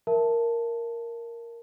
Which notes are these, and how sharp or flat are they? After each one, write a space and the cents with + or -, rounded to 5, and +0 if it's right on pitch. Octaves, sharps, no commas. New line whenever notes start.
A#4 +0 E5 +15 A5 +0